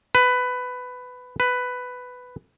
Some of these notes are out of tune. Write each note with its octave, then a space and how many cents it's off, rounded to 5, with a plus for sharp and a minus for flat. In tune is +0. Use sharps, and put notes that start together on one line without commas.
B4 +15
B4 +10